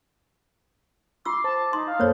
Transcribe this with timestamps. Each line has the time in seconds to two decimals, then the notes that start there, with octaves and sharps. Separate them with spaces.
1.25 F4 C6 D6 E6
1.44 C5 A5
1.73 D#4 C6 A6
1.87 F5
2.00 F#2 A#3 A4 C5 C#5